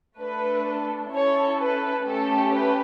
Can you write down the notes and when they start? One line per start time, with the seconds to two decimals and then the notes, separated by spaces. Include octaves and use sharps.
0.18 A3 D4 A4 B4
1.13 C#4 E4 A4 C#5
1.58 B4
2.05 A3 C#4 G4 A4
2.52 B4